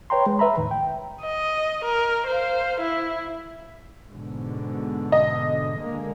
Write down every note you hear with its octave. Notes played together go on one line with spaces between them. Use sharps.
B4 C#5 G5 A#5 C6
G#3
B4 E5 A#5 B5
E2 A2 D#3
G5
D#5
A#4
C5 F5
E4
G#2 B2 D3
D#5
D3 G#3 A#3